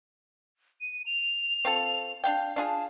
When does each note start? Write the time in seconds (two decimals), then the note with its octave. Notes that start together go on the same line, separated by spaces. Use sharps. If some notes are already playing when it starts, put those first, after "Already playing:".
0.81 D#7
1.06 F7
1.65 C4 F4 A4
2.24 D4 F5 G5
2.56 D4 F4 G#4 A5